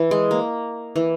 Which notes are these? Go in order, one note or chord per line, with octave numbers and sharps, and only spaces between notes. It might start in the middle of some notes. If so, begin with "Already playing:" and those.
Already playing: E3
G#3
A#3
E3